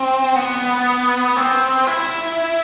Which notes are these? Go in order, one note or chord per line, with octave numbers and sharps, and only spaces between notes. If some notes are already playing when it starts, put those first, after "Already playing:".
Already playing: C4
B3
C4
E4